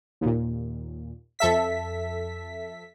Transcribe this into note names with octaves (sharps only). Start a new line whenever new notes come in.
D#2 A#2
F2 A4 E5 B6